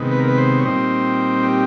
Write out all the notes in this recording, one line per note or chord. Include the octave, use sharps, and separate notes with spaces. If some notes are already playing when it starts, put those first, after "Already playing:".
Already playing: C3 D#3 G#3 B3
B4
A#4
B4
C5
C#5
A#2 G3 C4 D#4 C5
G4